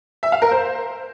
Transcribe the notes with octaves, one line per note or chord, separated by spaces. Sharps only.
E5
F5
A#4
C5